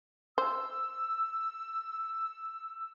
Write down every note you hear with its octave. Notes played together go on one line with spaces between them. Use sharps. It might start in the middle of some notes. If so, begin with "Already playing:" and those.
C5 E6